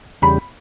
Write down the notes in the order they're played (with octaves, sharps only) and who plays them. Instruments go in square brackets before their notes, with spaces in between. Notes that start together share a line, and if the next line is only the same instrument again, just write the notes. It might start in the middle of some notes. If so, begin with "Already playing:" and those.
[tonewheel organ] E2 C#3 G3 [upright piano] B5